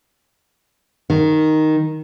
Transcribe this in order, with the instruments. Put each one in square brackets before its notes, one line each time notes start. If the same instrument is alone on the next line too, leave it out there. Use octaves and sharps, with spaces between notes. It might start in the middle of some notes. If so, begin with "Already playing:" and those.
[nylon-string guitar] D#3